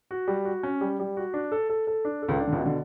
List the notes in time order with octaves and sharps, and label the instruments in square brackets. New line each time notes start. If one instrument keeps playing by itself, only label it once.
[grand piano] F#4
G3
F#4
C#4
G3
G3
F#4
D4
A4
A4
A4
D4
A4
[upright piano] C#2 C#3
[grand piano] D4
[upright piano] D3
C#2 C#3
[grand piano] B2
[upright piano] D3